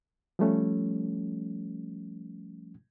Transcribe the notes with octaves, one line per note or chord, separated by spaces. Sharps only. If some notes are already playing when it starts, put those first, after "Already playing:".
F3 G3 A3 C#4